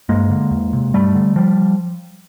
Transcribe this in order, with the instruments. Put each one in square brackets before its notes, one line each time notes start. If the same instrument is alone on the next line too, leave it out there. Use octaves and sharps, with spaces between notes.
[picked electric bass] G2 G#3 A#3
D3
E2
C3
G2 G3 A3
D3
F3 G3